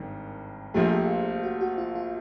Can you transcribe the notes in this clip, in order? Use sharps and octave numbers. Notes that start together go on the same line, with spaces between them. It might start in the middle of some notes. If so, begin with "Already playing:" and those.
Already playing: G#1 G2 D#3
A#1 A#2 F3 A3 G4
G#4
G4
F#4
F#4
F4
F4